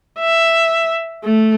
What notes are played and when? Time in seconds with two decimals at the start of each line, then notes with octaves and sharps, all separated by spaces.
0.20 E5
1.24 A3